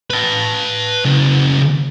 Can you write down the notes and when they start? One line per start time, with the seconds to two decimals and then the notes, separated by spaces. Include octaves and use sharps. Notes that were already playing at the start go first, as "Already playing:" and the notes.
0.11 B4 A5
1.05 C#3 A#3